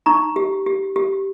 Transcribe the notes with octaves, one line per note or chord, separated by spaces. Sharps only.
D#4 A#5 C#6
G4
G4
G4